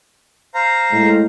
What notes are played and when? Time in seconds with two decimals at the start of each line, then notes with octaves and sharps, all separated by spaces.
0.54 C5 F5 A#5
0.92 A2 G#3